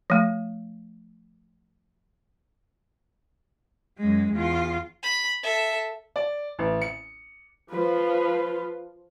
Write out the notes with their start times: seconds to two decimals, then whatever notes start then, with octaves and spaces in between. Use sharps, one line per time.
0.10 F3 A3
3.98 F#2 G#3
4.33 E2 F4
5.03 B5
5.43 A4 E5
6.16 D5
6.59 A1
6.82 C#7
7.71 F3 F4 B4